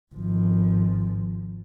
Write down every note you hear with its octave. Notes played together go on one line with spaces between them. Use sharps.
G#1 F3